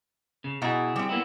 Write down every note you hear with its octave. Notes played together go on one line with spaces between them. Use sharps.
C#3
B2 E4 G#4 A#5
G3 C4
A#3 B3 E4